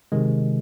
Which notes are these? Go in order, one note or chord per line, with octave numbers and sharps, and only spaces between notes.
C3 D#3 G#3